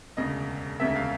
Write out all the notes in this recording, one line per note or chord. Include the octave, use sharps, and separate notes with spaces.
E1 D2 C#3 D#5
E1 D2 C#3 E5
F5